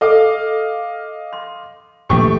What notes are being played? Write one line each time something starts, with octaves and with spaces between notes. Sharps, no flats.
A4 D#5 F5 D6
C6
D#1 A#1 E3 A3 G4 C#6